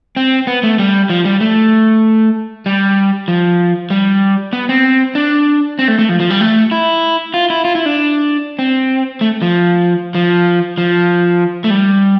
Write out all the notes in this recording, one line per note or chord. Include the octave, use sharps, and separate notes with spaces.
C4
B3
A3
G3
F3
G3
A3
G3
F3
G3
B3
C4
D4
C4
A3
A3
F3
F3
G3
A3
E4
F4
E4
F4
E4
D4
C4
A3
F3
F3
F3
A3
G3